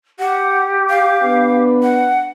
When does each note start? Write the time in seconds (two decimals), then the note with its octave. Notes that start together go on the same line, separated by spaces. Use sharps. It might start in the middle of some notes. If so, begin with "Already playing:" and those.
0.19 G4 F#5
0.89 F5
1.23 B3 D4 B4
1.83 F#5